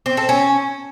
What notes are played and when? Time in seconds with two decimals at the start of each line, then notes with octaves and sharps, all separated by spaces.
0.06 C4
0.17 A4
0.29 C#4